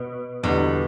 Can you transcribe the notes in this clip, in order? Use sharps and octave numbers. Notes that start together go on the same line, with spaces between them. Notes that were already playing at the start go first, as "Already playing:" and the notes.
Already playing: B2
E2 B2 D3 G3